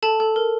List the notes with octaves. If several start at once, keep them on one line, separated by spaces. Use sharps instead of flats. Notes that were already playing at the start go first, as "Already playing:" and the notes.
A4 A5
A4
A#4